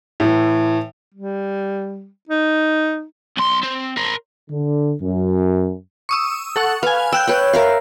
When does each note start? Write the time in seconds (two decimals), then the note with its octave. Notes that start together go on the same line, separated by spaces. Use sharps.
0.20 A2 E3
1.14 G3
2.29 D#4
3.37 B1 C6
3.63 C4
3.97 A#4 C5
4.49 D3
5.01 F#2
6.09 C#6 D#6 E6
6.56 A4 F#5 C#6
6.83 B4 F5 G#5
7.12 G5 E6 F#6 G6
7.27 B4 C#5 G5
7.53 A#4 E5 F5